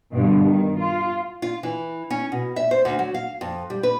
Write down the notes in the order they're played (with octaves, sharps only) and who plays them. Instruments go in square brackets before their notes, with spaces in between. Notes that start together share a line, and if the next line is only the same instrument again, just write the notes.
[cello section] G2 B2 D3
D#3
F4
[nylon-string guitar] F4
E3
C#4
B2
E5
C5
D2
F#3
F5
F2
G3
B4